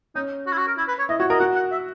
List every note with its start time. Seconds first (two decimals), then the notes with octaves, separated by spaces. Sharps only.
0.15 C#4 D#4
0.47 F#4
0.52 E4
0.57 F#4
0.67 A#4
0.78 E4
0.88 B4
0.99 C#5
1.09 E4 D#5
1.20 F#4 C#5
1.30 A#4 D#5
1.40 F#4 F#5
1.56 F#5
1.71 E5